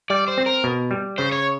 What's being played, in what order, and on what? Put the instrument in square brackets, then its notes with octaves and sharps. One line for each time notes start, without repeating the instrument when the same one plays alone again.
[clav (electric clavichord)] G3 [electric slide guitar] D5
[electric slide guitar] C5
[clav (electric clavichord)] C4
[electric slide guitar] A#4
[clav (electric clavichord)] B2
G3
[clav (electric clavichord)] C#3 [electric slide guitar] C5
[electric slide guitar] C#5